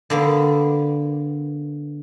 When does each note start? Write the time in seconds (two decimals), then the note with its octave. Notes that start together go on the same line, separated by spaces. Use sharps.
0.10 D3 A#3 B3